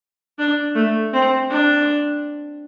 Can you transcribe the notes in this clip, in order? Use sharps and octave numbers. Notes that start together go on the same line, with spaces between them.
D4
A3
C4
D4